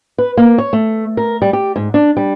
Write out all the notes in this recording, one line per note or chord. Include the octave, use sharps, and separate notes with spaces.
B4
A#3
C#5
A3
A#4
G3
G4
G#2
D4
G3